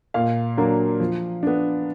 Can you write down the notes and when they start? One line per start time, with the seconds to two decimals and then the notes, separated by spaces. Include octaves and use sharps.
0.14 A#2 F5
0.57 F#3 A#3 D4
1.00 F3
1.43 B3 D4